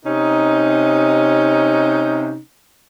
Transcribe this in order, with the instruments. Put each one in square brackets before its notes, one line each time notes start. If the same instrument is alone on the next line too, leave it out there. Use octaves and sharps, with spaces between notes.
[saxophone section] C3 C#4 D#4